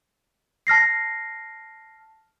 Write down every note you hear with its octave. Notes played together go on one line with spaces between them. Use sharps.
A5 F6 A#6 C7